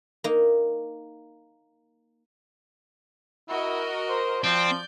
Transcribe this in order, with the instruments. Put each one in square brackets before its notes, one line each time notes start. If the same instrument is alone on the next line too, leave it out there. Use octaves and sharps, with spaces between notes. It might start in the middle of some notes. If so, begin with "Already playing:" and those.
[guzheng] A#3 D#4
[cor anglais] E4 [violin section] F#4 A#4 D#5
[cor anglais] C5
[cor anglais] F3 [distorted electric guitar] C4 [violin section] D5 G6